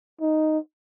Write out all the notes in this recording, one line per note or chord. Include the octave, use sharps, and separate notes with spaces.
D#4